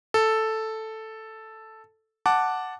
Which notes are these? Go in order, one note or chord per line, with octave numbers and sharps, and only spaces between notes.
A4
F#5 A5 D6